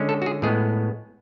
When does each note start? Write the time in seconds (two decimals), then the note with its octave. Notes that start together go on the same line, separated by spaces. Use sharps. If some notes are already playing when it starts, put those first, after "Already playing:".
Already playing: D3 G#3 C#4
0.09 A4
0.22 F#4
0.26 G#4
0.42 A2 G#3 B3 G#4